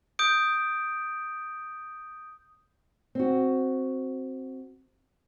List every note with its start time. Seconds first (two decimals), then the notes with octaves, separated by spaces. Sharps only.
0.19 D#6 G6 D7
3.15 C4 F#4